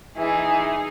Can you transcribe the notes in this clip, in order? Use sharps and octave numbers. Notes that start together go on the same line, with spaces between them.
E3 D#4 G#4